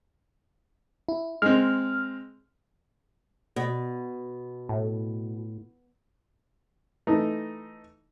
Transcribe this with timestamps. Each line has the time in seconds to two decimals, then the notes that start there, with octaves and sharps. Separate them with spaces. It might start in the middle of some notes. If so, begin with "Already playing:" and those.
1.09 E4
1.42 G#3 C4 F6
3.56 B2
4.69 A2
7.07 E3 A3 D#4